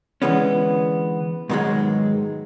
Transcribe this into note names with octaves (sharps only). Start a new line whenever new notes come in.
D3 E3 G#3 B3 C#4
G#2 B2 D#3 F3 F#3 G#3